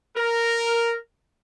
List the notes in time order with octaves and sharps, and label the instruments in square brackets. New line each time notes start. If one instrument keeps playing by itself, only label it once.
[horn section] A#4